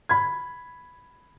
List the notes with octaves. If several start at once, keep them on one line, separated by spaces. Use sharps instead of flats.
B5 G#6